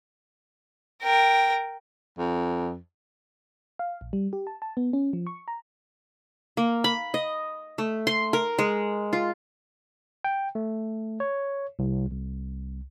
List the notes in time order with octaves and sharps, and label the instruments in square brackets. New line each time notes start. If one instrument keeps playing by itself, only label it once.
[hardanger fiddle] A#4 G5
[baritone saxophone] F2
[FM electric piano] F5
A#1
G3
G4
A5
A5
B3
C#4
F3
C#6
A#5
[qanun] A#3
B5
D#5
A3
C6
A#4
G#3
F4
[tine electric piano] G5
A3
C#5
C2
C2